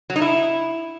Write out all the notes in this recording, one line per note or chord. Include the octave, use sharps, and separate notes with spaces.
F#3
D#4
E4